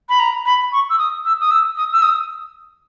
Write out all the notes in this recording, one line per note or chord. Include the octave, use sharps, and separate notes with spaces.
B5
A#5
B5
C#6
E6
D#6
E6
D#6
E6
D#6
E6
D#6